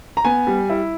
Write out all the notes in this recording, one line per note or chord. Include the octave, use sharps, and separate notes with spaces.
A#5
B3 G#5
G3
E4